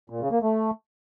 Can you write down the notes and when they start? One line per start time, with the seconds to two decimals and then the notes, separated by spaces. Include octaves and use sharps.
0.10 A#2
0.21 C#3
0.32 A#3
0.43 A3